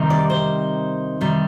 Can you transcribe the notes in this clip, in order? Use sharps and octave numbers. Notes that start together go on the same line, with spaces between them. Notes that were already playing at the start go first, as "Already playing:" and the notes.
Already playing: C3 D#3 G3 C4 D#4
D5
C5
C3 D#3 G3